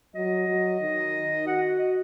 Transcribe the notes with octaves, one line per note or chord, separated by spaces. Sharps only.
F#3 D#5
F#3
D#3
F#4 F#5
D#5
D#5